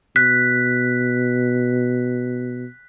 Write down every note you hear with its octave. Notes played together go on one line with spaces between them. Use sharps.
B2 F#6 B6